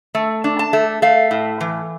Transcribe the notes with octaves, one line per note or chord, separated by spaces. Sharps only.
A3
D4
A5
A3
A3 F5
A2
E3